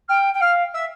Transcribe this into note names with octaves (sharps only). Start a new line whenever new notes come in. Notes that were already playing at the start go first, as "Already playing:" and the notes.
G5 F6
G5
F5 F6
E5 E6